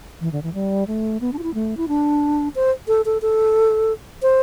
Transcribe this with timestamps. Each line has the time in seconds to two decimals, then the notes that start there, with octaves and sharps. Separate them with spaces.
0.21 E3
0.32 D3
0.43 E3
0.54 G3
0.87 A3
1.21 B3
1.33 D4
1.39 F4
1.43 E4
1.54 A3
1.77 E4
1.88 D4
2.55 C5
2.88 A4
3.06 A4
3.22 A4
4.22 C5